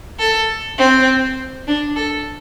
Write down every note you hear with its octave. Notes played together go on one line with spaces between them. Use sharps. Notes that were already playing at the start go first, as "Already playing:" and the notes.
A4
C4
D4
A4